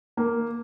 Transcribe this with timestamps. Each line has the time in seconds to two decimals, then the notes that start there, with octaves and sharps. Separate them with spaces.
0.17 A#3